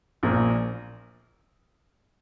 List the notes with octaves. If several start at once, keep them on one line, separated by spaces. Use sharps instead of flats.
A#1 A#2 A#3